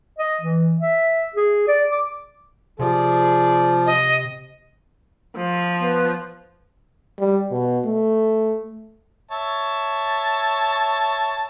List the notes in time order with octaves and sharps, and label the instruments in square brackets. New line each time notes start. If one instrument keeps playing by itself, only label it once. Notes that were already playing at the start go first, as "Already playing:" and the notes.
[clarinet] D#5
E3
E5
G#4
D5
D6
[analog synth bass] C3 [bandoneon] F3 [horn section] G#4 D5
[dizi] D#5
[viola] F3
[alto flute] B3
[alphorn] G3
B2
A3
[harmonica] C#5 E5 A5